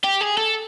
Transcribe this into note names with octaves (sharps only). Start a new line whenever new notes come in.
G4
G#4
A4